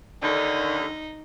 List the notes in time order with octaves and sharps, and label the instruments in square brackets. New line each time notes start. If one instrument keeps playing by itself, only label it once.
[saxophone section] D#2 D3 [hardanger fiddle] D#4